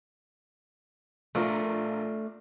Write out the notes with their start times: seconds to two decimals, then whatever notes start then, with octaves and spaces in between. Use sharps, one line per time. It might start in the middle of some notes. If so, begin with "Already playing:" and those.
1.35 A#1 A3 D4 F4 A#4